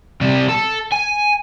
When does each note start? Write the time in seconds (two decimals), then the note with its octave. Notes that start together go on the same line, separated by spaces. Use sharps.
0.21 C3 G3
0.49 A4
0.92 G#5